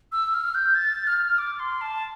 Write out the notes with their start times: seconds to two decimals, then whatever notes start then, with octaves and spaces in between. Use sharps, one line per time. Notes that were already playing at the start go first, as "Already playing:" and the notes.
0.12 E6
0.34 F6
0.55 G6
0.75 A6
1.07 F6
1.38 D6
1.59 C6
1.81 A5